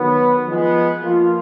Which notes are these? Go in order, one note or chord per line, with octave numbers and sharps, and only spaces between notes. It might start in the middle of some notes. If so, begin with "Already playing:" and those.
Already playing: D#3 F#3 B3
F3 G#3 B3
F3 A#3 F4